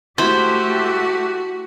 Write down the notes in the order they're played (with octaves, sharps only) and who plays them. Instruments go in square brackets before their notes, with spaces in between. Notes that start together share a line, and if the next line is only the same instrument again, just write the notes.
[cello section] A3 G4 [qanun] E4 B5 [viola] F#4 [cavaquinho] C5